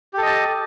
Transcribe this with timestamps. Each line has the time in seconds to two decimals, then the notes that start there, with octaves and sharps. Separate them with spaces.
0.13 G4
0.18 A4
0.22 D#5
0.27 A5